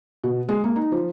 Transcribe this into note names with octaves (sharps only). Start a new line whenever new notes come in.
B2
G#3
A#3
D#4
F3